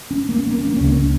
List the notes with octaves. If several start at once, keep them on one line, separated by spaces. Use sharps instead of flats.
C#4
A#3
C#4
A#3
C#4
A#3
C#2 C#3 C#4
A#3
C#4